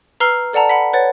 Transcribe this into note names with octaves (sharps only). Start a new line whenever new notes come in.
B4 A#5 E6 F6 C7 G7
A4 D5 F#5 A5 A#5
F#5 B5 B6
B4 C#5 F#5 A6